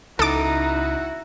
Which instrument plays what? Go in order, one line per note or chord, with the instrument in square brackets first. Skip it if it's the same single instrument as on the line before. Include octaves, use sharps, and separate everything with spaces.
[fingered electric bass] C#2 [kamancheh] D#4 [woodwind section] E4 F#4 [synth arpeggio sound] A4 D6